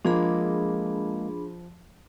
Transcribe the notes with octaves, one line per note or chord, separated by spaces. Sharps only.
F3 G#3 A#3 D4 G#4 B5